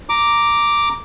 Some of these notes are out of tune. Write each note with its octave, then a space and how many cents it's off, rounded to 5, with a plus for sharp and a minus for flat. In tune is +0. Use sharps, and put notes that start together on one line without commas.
A#5 +0 D6 +0